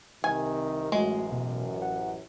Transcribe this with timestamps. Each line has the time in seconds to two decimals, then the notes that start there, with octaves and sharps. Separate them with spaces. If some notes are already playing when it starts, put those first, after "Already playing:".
0.24 C2 C3 D#3 G#5
0.92 A1 F#2 G#3 A3 F#4
1.32 B2
1.82 F#5